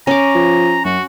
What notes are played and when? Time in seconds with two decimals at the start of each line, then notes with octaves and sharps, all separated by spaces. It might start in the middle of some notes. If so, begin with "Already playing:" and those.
0.07 C#4 A#5 D6
0.35 F3
0.85 F#2 F#4